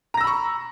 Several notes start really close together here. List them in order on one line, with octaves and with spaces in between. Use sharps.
A#5 A#6 E6 B5 C#6